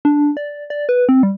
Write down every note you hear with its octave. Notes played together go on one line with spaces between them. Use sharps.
D4
D5
D5
B4
C4
G3